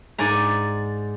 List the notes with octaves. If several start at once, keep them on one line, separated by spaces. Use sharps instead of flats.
G#2 D5 G#5 A#5